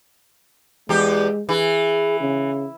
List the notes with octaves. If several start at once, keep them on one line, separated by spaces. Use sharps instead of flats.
E2 G#3 G4
E3 G#4
C#3